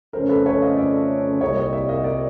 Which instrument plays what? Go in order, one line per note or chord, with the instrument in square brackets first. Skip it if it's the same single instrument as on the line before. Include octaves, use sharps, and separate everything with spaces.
[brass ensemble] F2 C#3 F3 A3 C#4 [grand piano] A#4 C5
[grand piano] A4 B4
B4 C#5
D#5 F5
D5 E5
[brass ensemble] C2 A#2 G3 [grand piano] C#5 D#5
[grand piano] C#5 D#5
D5 E5
D#5 F5
D5 E5